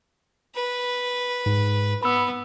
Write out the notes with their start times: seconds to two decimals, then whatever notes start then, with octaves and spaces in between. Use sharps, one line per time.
0.55 B4
1.46 G#2
2.03 B3 B5 E6